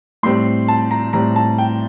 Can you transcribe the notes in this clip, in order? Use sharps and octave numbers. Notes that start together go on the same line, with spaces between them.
A2 G3 C4 C6
A5
A#5
A2 G3 C4 A#5
A5
G5